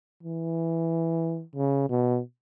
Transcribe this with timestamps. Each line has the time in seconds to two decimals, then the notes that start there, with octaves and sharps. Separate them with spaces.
0.23 E3
1.56 C#3
1.90 B2